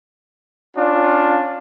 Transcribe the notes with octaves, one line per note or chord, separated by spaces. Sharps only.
C#4 D4 F4